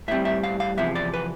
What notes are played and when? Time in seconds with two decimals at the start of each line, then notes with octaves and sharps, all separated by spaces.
0.08 A2 G3 C4 E5
0.25 E5
0.43 F5
0.60 F5
0.77 E2 C3 F3 E5
0.95 D5
1.14 B4